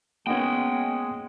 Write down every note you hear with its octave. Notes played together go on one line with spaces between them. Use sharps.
G#3 A#3 B3 C#4 D#4 F#4 F#5 G5